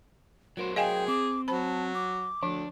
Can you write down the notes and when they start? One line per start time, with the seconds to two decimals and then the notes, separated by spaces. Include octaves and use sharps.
0.57 F#3 F#4 A#4 C5
0.76 G#4 D#5 F5 G5 G#5
1.08 C4 D6
1.48 F#3 C5 A5 B5
1.95 D6
2.43 D2 F3 D4